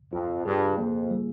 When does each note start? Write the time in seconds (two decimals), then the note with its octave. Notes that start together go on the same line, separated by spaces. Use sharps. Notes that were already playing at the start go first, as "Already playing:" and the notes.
0.13 F2 F4
0.45 G2 G#4
0.78 F2 A#3
1.11 G3